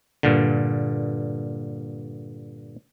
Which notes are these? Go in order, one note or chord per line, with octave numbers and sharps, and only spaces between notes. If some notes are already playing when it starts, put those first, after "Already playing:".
G2 A#2 D3